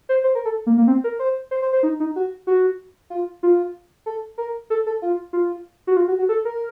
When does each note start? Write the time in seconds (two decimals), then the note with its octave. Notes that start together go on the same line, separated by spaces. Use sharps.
0.09 C5
0.24 C5
0.35 A#4
0.45 A4
0.66 A#3
0.78 A#3
0.87 C4
1.04 A#4
1.19 C5
1.51 C5
1.62 C5
1.73 C5
1.83 D#4
2.00 D#4
2.16 F#4
2.47 F#4
3.10 F4
3.43 F4
4.06 A4
4.38 A#4
4.70 A4
4.86 A4
5.02 F4
5.33 F4
5.87 F#4
5.97 F4
6.08 F#4
6.19 F#4
6.29 A4
6.45 A#4